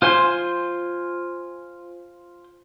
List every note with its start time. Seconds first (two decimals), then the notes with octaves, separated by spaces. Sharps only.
0.02 F4 C5 G#5 C6